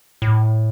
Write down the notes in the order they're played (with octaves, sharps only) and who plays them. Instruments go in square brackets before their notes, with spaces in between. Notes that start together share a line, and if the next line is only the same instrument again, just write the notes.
[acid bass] A2